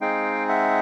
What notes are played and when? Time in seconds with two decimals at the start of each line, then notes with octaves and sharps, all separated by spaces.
0.01 G#3 C4 D#4 G#4 F5 G5
0.49 E5 F#5